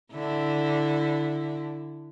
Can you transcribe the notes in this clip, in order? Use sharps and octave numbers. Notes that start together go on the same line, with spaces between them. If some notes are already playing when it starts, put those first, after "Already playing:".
D3 E4